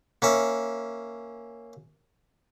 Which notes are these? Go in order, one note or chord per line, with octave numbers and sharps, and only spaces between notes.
A#3 C#4 E5